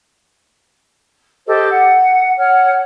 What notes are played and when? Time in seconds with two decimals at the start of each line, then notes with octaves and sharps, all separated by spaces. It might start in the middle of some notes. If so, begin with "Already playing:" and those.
1.47 G4 A4 C5 D#5
1.70 F#5
2.38 C#5 F#5 F6